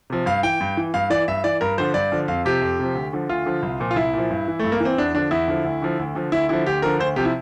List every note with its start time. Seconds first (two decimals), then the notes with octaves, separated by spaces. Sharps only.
0.10 C3 F3
0.26 G2 F5
0.43 E3 G5
0.61 G2
0.77 E3
0.94 G2 F5
1.10 E3 D5
1.28 G2 E5
1.44 E3 D5
1.61 G2 A#4
1.78 D3 F3 C5
1.94 G2 D5
2.12 D3 F3
2.28 F2 F5
2.45 C3 F3 G4
2.62 F2
2.79 C3 F3
2.95 D2
3.13 D3 F3
3.29 D2 F4
3.46 D3 F3
3.63 C2
3.80 A#2 F3
3.91 F4
3.96 C2 E4
4.13 A#2 F3
4.30 G2
4.48 E3
4.59 G2 A3
4.72 A#3
4.80 E3 C4
4.98 E2 D4
5.15 D3 F3 D4
5.31 E2 E4
5.48 D3 F3
5.65 D2
5.82 D3 F3
5.99 D2
6.15 D3 F3
6.32 D2 E4
6.49 D3 F3 E4
6.66 D2 G4
6.82 D3 F3 A#4
6.99 D2 C5
7.16 C3 F3 G4
7.25 E4